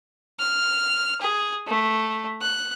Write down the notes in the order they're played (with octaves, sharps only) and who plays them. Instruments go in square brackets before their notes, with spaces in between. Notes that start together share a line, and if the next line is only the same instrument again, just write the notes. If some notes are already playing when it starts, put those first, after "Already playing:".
[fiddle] F6
G#4
A3
F#6